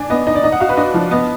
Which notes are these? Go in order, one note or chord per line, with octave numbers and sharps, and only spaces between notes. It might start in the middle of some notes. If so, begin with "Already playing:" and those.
Already playing: D4 G#5
B3 D#5
D#4 D#5
D5
D#4 D#5
F#5
F#4 F5
B4
D4 D#5
F3
B3 D#5